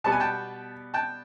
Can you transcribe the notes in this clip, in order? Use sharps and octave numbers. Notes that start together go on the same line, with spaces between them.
B2 G3 B3 A5
G#5
G5 A5
G5 A5